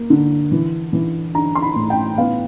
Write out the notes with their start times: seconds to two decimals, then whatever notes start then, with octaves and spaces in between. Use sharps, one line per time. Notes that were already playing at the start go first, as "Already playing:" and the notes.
Already playing: A#3
0.10 D3
0.52 E3
0.93 E3
1.35 D4 A#5
1.55 C6
1.62 B5
1.76 A2
1.90 G5
2.18 B3 F5